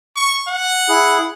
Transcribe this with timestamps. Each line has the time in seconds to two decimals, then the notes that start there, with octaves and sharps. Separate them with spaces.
0.16 C#6
0.48 F#5
0.89 E4 G#4